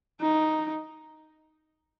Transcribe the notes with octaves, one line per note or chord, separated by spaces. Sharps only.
D#4